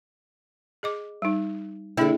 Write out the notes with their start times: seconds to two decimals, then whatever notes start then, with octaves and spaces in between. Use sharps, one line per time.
0.83 G#4 D#5 D6
1.22 G3 D#4
1.97 D3 A#3 D4 E4 G#4